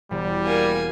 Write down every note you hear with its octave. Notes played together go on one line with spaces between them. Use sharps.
E1 G3
A#3 G#5